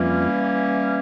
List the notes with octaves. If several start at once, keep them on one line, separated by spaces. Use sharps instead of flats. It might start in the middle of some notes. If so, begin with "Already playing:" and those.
Already playing: F2 E3 F3 G3 A#3 C#4